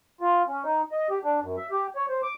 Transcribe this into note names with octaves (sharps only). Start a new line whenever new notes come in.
F4
C#4
D#4
D#5
G4
D4
F#2
E5
G4
C#5
C5
D6